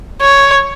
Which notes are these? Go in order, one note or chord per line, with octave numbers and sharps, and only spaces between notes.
C#5